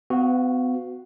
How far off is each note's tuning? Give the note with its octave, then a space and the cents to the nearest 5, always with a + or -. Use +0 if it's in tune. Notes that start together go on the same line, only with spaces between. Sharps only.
B3 +40 F#4 -5 F5 +0